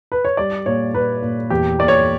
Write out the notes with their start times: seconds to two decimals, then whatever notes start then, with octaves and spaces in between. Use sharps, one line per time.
0.12 B4
0.25 C#5
0.37 G3 D5
0.66 A#2 C#5
0.94 A#2 B4
1.22 A#2
1.50 E2 G4
1.79 A#3 D5
1.88 C#5